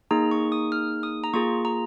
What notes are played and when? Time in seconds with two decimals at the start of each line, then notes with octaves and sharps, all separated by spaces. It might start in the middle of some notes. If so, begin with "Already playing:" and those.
0.11 A#3 D#4 G#4 A#5
0.31 C#6
0.52 D#6
0.72 F6
1.03 D#6
1.24 A#5
1.34 A#3 F4 G#4 C#6
1.65 A#5